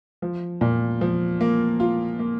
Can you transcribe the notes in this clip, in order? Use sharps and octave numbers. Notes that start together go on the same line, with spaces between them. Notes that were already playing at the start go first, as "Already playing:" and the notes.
F3
A#2
F3
A#3
F4
A#3